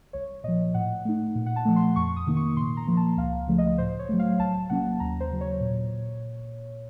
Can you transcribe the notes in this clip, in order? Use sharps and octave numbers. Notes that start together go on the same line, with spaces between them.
C2 C#5
A#2 F3 D#5
A2 F#5
A3 D#4
A#2
F#5
A5
F3 A3
C6
F2 C#6
D#6
C3 D#3 A#3
C#6
A#2 C6
A#5
F3 A#3
A5
C#2 F5
C#3 F3 A3
D#5
A2 C5
C#5
F#3 A3
F5
C2 A5
C3 F#3 A#3 C#4 F#5
D#2 A#5
C5
C#3 F#3
C#5
A#2